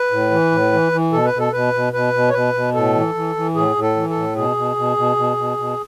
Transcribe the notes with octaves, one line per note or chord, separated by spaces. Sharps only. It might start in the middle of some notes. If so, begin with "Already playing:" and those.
Already playing: B4
A2
E3
A2
E3
E3
B2 A4
B4
B2
A4
B2 B4
B2
B2 B4
B2
C#5
B2 B4
B2
A2 A4
E3
E3
E3
A2 G#4
A2
A4
E3
A4
A2
B2 G#4
B2
B2
B2
B2
B2
B2